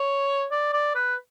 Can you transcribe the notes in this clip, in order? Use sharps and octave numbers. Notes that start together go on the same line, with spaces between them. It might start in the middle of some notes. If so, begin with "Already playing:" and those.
Already playing: C#5
D5
D5
B4